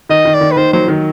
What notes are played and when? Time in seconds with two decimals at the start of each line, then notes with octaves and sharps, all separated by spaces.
0.09 D#3 D#5
0.25 D#3
0.34 D5
0.41 D#3
0.51 B4
0.57 D#3 C5
0.73 F#3 C5
0.88 D#3